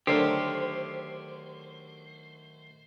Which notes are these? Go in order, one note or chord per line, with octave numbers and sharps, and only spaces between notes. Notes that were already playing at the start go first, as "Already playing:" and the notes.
D3 D#3 F#3 A3 G4 A#4 C5